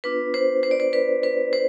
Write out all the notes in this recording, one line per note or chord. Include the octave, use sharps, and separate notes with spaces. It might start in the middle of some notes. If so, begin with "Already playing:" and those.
B3 D4 F4 B4
C5
C5
D5
C5
B4
B4
C5